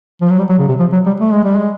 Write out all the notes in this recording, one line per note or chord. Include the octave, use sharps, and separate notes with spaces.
F3
F#3
G3
F#3
C#3
C3
F3
F#3
G3
A3
G#3
G3
G#3